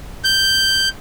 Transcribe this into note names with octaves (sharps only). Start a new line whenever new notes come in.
G6